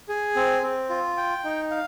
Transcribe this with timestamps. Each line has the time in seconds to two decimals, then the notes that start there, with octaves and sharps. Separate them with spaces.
0.09 G#4
0.36 C4
0.63 C4
0.90 F4
1.17 G5
1.44 D#4
1.71 F5